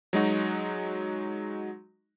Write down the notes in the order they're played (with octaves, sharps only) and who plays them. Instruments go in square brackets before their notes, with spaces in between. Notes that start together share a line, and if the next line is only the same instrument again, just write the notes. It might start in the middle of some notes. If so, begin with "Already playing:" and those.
[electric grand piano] F#3 G#3 D#4 F#4